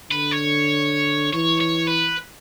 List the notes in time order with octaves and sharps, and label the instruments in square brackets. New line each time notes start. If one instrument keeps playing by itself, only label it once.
[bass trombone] D3 [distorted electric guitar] B4
[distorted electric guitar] C#5
[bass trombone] E3 [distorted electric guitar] C#5
[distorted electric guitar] C#5
B4